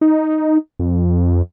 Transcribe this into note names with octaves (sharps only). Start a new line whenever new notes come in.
D#4
F2